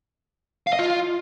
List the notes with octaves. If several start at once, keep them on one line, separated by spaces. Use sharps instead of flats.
F5
D#5
F4